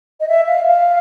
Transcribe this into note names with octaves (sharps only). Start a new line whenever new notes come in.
D#5
E5
F5
F5